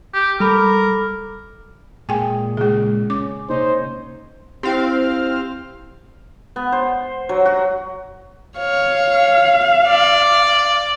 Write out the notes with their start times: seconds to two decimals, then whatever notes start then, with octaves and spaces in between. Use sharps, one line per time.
0.14 G4
0.40 G3 A4 A#4 B5 D6
2.09 A#2 G#3 G#4 G5 G#5
2.57 C#3 G#3 G#4
3.10 C#4 D6
3.50 C3 A#3 D#4 C5 C#5
4.63 C4 E4 G4 F5
6.56 B3
6.72 C5
7.29 F#3
7.46 F#4
8.58 C#5 F5
9.87 D5